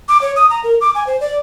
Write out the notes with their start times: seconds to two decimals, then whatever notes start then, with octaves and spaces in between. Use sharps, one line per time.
0.09 D6
0.22 C#5
0.36 D#6
0.50 A#5
0.64 A#4
0.81 D6
0.95 G#5
1.07 C5
1.21 D5